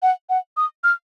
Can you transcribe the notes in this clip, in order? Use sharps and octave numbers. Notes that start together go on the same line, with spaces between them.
F#5
F#5
D#6
F6